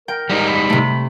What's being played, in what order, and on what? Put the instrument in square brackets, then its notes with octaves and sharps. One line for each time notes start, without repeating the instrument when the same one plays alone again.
[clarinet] A#4 [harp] G5
[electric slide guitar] G3 G#3 D#4
[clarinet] B5
[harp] C3 A3